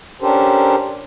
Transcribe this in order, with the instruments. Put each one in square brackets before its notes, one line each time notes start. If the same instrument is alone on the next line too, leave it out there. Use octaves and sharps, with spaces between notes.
[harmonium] C#4 D4 G4 A4 A#4 C5